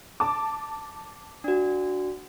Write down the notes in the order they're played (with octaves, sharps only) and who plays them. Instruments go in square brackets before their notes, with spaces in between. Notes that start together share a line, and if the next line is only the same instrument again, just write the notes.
[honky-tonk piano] A5 D6
[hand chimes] D4 F#4